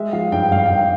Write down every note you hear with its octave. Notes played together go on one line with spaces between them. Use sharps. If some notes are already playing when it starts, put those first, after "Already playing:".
Already playing: G#3 E5
F3 F5
G2 G5
G2 F5
G2 G5
F5